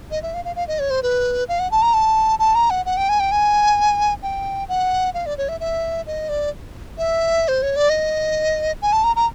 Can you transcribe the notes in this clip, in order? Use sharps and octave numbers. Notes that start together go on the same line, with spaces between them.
D#5
E5
F5
F5
F5
D#5
C#5
C5
B4
F5
F#5
A5
A#5
A5
A5
A#5
F#5
F#5
G5
G#5
G5
G#5
G5
F#5
F5
D5
C#5
E5
E5
D#5
D5
E5
C5
C#5
D5
D#5
G#5
A5
A#5
A#5